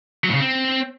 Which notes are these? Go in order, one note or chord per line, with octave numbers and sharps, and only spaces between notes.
F#3
A2
C#3
C4